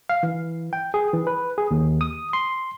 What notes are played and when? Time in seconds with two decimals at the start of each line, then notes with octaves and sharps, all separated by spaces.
0.09 F5
0.23 E3
0.73 G5
0.94 G#4
1.13 E3
1.27 B4
1.58 G#4
1.71 D#2
2.01 D#6
2.33 C6